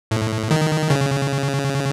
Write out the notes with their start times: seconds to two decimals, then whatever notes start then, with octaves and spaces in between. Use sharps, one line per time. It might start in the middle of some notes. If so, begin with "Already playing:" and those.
0.11 A2
0.51 D#3
0.90 C#3